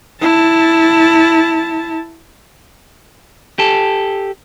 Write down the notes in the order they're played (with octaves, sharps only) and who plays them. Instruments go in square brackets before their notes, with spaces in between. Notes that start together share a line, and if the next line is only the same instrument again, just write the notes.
[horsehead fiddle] E4 A5
[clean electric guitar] G4 A4